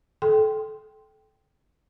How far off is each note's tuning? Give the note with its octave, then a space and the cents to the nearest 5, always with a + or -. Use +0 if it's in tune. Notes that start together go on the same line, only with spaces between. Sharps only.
A4 -25 G5 +0 C6 +0